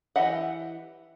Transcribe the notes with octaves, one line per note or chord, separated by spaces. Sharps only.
E3 G4 D#5 E5 F#5